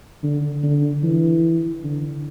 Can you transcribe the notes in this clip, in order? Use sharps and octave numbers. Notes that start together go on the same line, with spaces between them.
D3
D3
E3
D3